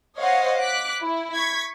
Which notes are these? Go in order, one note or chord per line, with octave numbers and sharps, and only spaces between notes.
C5 C#5 D#5 F5 F#5
D6 F#6 B6
E4
C#6 G#6 B6